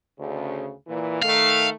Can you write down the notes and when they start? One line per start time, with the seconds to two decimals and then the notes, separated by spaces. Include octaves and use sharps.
0.19 D2 C#3
0.87 A#2 E3
1.22 D#3 A3 F5